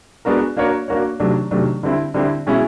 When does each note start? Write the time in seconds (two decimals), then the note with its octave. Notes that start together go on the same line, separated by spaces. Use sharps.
0.25 G#3 B3 D4 F#4 A#4
0.57 A#3 D4 F#4 A#4 C#5
0.88 A#3 D4 F#4 A#4 C#5
1.20 C3 D#3 F#3 A3 D4
1.51 C3 D#3 F#3 A3 D4
1.83 D3 G3 C4 E4
2.14 D3 G3 C4 E4
2.47 B2 G#3 C#4 E4